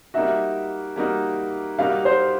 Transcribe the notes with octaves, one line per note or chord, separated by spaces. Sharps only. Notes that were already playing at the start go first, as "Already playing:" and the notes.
G3 A#3 D#4 F#4 E5
G3 A#3 D#4 F#4
G3 A#3 D#4 F#4 F5
C5